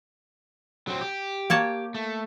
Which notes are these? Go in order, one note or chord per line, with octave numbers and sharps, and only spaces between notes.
F#3 C4
G4
A#3 C#5 A5
A3